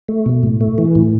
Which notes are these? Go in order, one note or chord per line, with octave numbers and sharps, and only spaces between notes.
A3
B2
A2
A3
E3
A2